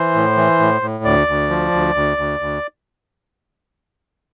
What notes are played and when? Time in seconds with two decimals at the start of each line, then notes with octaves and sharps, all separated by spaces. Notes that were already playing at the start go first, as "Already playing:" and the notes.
Already playing: E3 C5
0.15 A2
0.37 E3
0.59 A2
0.82 A2
1.04 D2 D5
1.27 D2
1.50 F3
1.72 D2
1.95 D2
2.17 D2
2.40 D2